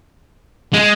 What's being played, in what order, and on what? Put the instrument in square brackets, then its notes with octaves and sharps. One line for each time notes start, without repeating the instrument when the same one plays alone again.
[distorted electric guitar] G#3